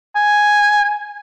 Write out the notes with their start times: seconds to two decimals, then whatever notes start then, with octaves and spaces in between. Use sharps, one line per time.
0.16 G#5